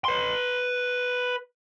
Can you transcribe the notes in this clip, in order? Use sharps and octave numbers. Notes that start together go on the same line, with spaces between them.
B4 C6